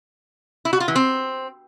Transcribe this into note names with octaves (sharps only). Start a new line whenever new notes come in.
E4
F#4
F4
E3
C4